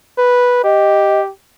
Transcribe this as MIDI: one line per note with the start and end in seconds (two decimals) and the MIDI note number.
0.18 0.60 71
0.64 1.30 67
0.64 1.20 75